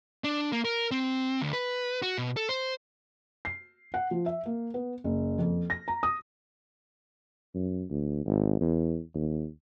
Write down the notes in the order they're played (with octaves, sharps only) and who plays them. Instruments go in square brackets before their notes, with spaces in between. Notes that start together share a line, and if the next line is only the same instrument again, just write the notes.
[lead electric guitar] D4
A#3
A#4
C4
D2
B4
F#4
B2
A4
C5
[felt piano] C7
F#5
F3
E5
A#3
B3
F#1
F2
A#6
A#5
D#6
[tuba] F#2
D2
G#1
E2
D#2